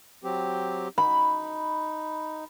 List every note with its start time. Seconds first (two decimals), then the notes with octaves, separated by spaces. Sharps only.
0.24 F#3 C4 G4
0.98 D#4 B5